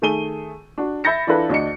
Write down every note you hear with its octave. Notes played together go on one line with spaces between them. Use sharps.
D#3 A3 G#4 D#7 G7
D4 F#4
E5 B5 G6 A6 A#6 C#7
E3 D4 E4 F4 A4 B4
D2 D4 D#5 C#7